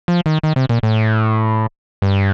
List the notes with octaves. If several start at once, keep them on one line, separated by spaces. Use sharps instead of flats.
F3
D#3
D#3
C3
A#2
A2
G2